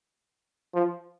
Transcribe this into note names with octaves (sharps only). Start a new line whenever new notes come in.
F3